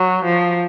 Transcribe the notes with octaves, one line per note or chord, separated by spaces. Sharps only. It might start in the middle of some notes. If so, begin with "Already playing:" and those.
Already playing: F#3
F3